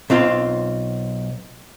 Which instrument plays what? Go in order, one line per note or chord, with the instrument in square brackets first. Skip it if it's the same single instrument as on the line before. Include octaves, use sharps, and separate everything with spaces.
[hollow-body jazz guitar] B1 C4 F4 A#5 C6